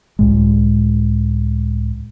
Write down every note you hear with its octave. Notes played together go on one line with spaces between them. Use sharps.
C#2 A2 G#3